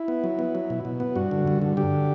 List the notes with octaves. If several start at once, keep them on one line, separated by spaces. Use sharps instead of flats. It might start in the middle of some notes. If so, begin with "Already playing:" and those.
Already playing: E4
B3
F#3
B3
F#3
B2
B2
B3
G2 F#4
D3
G2
D3
D3 G4